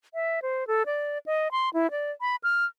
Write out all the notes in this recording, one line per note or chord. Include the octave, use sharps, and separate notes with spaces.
E5
C5
A4
D5
D#5
C6
E4
D5
B5
F6